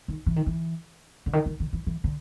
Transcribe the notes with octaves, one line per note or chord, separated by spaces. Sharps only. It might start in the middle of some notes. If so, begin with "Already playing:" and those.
D#3
E3
D#3
E3
D3
D#3
D#3
D#3
E3
E3
D3